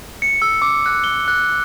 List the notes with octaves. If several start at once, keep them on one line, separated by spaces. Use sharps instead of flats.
C#7
E6
D6
F#6
G7
F#6